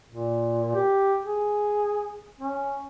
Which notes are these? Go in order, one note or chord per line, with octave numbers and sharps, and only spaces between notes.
A#2
G4
G#4
C#4